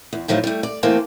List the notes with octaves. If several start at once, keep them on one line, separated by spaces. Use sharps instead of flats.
E2
A2 D#3 F3 F#3 A3
G3 A3
D5
E3 A3 A#3 C4 A4 C5